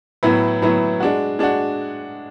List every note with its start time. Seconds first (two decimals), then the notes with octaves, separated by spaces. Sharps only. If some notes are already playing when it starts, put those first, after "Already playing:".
0.23 A2 F#3 B3 E4
0.62 A2 F#3 B3 E4
1.00 G#3 D4 F#4
1.39 G#3 D4 F#4